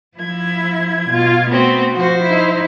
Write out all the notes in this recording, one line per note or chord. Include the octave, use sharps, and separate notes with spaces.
F3 E4 G#6
B2 F4
A3 B3 C4 F#4
F3 F#4 C5
D#4 E4